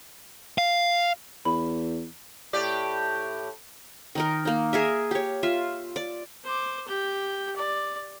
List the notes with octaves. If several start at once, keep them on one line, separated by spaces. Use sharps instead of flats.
F5
E2 B5
A2 G4 D5
D#3 D#4 A#4
A#3 D#4
G#4 A#4 E5
G4 C#5
F4 E5
D5
C5 D6
G4 G5
D5